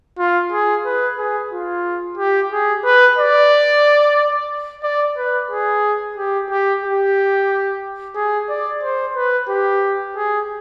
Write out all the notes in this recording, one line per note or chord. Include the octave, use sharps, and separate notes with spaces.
F4
G#4
B4
G#4
F4
G4
G#4
B4
D5
D5
B4
G#4
G4
G4
G4
G#4
D5
C5
B4
G4
G#4